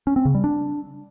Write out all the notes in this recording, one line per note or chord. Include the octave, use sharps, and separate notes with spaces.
C#4
C4
C#3
G3
D4